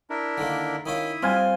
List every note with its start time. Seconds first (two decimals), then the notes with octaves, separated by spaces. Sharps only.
0.10 D4 E4 A#4
0.38 D3 D#3 A#3
0.86 D#3 C#4 E4 F4 D#6
1.23 G3 C4 F4 G#5